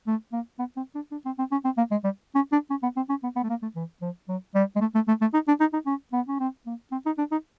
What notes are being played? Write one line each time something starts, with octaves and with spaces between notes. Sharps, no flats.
A3
A#3
B3
C4
D4
D4
C4
C4
C#4
C4
A#3
G#3
G3
C#4
D4
C#4
B3
C4
C#4
B3
B3
A3
A#3
A3
E3
F3
F#3
G3
G#3
A3
A3
A3
A3
D#4
D4
D#4
D#4
C#4
B3
C#4
C4
A#3
C4
D#4
D4
D#4